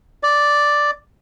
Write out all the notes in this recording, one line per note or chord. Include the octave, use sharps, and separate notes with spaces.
D5